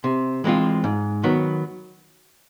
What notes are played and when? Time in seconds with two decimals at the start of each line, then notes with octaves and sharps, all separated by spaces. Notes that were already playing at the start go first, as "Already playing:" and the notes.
0.04 C3
0.44 E3 G#3 C4 F4
0.84 G#2
1.23 D#3 F#3 B3